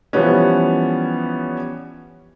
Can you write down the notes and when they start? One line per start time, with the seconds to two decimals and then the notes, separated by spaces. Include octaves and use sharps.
0.13 E3 F3 G3 B3 C#4